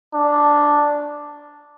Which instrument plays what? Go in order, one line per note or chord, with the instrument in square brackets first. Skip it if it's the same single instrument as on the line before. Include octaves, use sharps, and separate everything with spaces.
[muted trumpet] D4